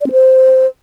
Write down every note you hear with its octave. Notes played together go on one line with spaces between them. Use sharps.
D5
C4
C5